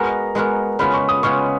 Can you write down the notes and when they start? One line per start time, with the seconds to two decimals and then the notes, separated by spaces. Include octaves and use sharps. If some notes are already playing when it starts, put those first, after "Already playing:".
Already playing: G#3 B3 F#4 A#4 A#5
0.35 G#3 B3 F#4 A#4
0.79 C#3 G#3 B3 F4 B5
0.94 C#6
1.09 D#6
1.23 C#3 G#3 B3 F4 C#6